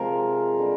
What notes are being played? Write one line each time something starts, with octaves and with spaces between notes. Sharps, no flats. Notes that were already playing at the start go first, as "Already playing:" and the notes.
Already playing: C3 F3 G#3 A#4 F5
D3 G3